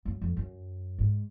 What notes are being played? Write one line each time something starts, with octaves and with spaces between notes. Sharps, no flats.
F#2
F2
F#2
G#2